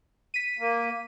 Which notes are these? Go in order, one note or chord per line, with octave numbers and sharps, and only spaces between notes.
B6 D#7
A#3